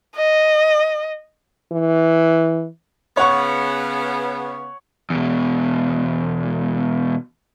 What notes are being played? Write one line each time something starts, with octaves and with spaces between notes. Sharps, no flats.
D#5
E3
C#3 B3 C#5 F#5 C#6
E2 B2